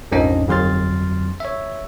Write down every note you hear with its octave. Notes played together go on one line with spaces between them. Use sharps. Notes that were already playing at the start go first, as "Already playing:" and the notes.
A#1 F2 G#2 C#4 D4 D#5
G1 F2 F#3 C6 F6 A6
C#5 E5